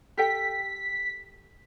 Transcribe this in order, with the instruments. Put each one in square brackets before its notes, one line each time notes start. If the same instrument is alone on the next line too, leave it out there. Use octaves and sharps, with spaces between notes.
[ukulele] G4 A4 G5 [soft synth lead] B6